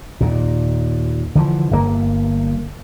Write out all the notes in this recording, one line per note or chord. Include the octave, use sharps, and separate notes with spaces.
D#2 A#2
D3 E3 F3
G1 G2 C3 A#3